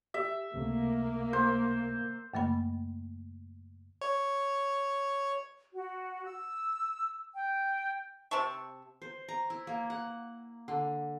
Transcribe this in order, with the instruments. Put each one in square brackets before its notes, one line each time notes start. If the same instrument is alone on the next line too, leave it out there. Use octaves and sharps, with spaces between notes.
[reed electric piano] G4 [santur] E5
[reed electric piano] C#2 C3 A3 [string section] A#3
[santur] C5
[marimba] F#2 C#3 A3 A#3 D#5 B5
[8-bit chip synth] C#5
[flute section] F#4
E6
G5
[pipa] C3 C4 A5 C#6
[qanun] C5
A#5
E4
A#3
F#5
D3